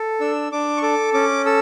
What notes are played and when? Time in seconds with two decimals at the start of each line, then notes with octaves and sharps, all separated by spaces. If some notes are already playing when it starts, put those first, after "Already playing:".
Already playing: A4
0.20 D4 E6
0.52 D4 D6
0.77 C#6
0.82 A4 D6
1.14 C#4 D6
1.46 A4 E6